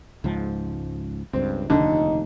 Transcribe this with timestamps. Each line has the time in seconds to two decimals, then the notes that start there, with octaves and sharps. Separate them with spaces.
0.24 C#2 G#2 F3
1.33 C#2 G2 C4
1.70 F1 D#2 D3 D#4